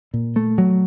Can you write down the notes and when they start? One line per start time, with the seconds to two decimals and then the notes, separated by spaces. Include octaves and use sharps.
0.14 A#2
0.36 A3
0.58 F#3